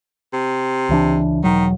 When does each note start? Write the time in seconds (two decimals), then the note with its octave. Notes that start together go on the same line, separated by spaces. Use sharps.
0.33 C3
0.89 C#2 E3 D4
1.44 E1 D#3 F#3